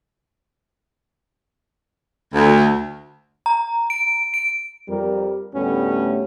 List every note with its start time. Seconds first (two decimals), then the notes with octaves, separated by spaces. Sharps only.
2.34 D2
3.46 A#5
3.90 D7
4.34 D7
4.88 F2 G3 A#4
5.54 D2 A2 G3 A3 B3 C#4